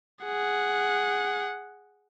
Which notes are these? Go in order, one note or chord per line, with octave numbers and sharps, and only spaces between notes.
G#4 F#5